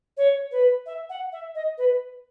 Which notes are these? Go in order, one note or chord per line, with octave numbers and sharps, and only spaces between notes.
C#5
B4
E5
F#5
E5
D#5
B4